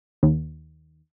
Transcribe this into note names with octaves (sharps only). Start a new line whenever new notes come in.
D#2